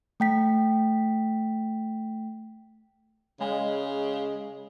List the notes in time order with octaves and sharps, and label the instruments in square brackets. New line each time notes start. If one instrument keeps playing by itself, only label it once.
[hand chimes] A3 G5 B6
[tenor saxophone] C#3 [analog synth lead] G#3